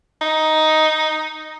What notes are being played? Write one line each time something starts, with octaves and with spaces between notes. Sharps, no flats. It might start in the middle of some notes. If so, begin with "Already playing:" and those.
D#4